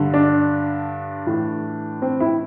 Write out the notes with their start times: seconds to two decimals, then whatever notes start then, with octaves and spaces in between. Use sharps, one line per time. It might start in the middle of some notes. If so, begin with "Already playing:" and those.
Already playing: G2 D3
0.14 D4
1.27 A2 E3
2.02 C4
2.20 E4